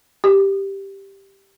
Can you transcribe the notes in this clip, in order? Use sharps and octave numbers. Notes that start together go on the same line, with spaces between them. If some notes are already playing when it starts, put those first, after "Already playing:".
G4